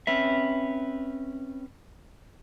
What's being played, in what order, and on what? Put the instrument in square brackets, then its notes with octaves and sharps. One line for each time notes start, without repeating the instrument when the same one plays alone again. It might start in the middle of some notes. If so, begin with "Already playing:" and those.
[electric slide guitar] C4 C#4 B4 E5